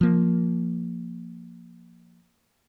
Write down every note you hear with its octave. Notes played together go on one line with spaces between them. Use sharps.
F3 A#3